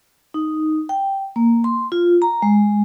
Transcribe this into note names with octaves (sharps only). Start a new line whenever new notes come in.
D#4
G5
A#3
C6
F4
A#5
G#3